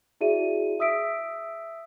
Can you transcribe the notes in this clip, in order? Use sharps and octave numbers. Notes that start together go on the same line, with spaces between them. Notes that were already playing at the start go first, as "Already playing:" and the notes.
E4 F#4 G#4 D5 E5 D#7
E5 D#6 E6 B6 D7